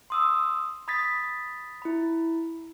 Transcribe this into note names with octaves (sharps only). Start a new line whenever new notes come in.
C6 D#6 E6
B5 D#6 G#6 A6 B6
E4 B5